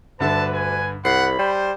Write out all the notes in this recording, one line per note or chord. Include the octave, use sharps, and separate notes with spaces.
D2 G2 D3 B4 E5 A5
G#5
C2 F#5 B5 C7
G3 C5